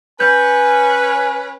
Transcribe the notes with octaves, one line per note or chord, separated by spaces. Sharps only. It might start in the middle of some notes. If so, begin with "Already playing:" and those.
C#4 B4 G#5 G6